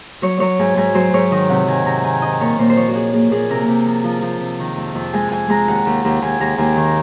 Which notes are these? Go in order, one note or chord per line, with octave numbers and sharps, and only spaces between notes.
F#3 C#5
F#3 C#5
G#2 G#5
G#2 G#5
F#3 C5
G#2 C#5
D#3 D#5
C3 F#5
D#3 G#5
C3 A#5
D#3 G#5
D#3 D#5
A#2 C#5
A#2 C5
C5
F3 C#5
F#4
F3 G#4
A#3 G#4
A#2 G#4
C3 A#4
C3
F3
F3
F3
C3
D#3
F2
F2
G#3 G#5
F2 G#5
G#3 A#5
D#2 F#5
D#2
D#2
D#2 G#5
D#2 A#5
D#2 G#5
D#3